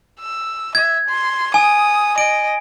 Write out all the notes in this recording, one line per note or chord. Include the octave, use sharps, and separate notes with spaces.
E6
E5 G#6
C6
G#5 D#6
D#5 D7